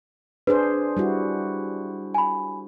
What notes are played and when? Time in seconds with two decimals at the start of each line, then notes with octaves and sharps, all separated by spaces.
0.47 D4 G#4 B4 C5
0.97 G3 E4 F#4
2.14 G#5 B5